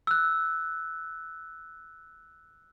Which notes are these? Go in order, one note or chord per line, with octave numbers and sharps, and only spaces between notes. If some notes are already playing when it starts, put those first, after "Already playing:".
E6 F#6